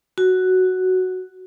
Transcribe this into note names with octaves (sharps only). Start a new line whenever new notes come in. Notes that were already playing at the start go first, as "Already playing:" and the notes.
F#4